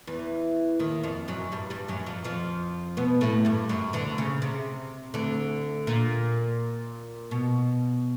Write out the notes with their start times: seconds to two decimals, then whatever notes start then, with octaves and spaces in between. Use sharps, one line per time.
0.07 E2 E3
0.79 D#2 D#3
1.03 F2 F3
1.28 F#2 F#3
1.52 G2 G3
1.70 G2 G3
1.88 F#2 F#3
2.06 F2 F3
2.24 F2 F3
2.97 B2 B3
3.21 A2 A3
3.45 G2 G3
3.69 F#2 F#3
3.93 D2 D3
4.18 C#3
4.42 C3
5.14 D2 D3
5.87 A#2
7.31 B2